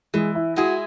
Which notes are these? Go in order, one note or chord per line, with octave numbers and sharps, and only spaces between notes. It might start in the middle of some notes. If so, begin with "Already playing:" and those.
E3 G#3
E4
G#3 E4 F#4 G#4